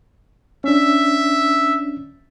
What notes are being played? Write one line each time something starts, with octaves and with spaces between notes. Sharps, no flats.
C#4 D4 E5